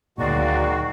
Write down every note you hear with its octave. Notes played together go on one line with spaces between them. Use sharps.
D2 A#2 D#3 F#3 G#3 F#4 D5 F5